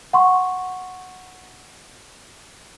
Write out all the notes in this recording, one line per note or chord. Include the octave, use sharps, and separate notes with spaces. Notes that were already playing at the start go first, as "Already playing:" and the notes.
F#5 C6 C#6